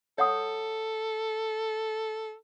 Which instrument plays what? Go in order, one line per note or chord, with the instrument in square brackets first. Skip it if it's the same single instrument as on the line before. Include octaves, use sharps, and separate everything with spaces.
[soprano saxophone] A4 [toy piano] C#5 F#5 D#6